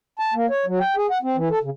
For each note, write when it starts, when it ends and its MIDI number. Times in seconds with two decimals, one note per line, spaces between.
0.19 0.34 81
0.34 0.46 58
0.50 0.65 73
0.66 0.79 54
0.80 0.95 79
0.97 1.07 68
1.11 1.18 78
1.23 1.36 60
1.37 1.49 52
1.50 1.59 69
1.63 1.70 49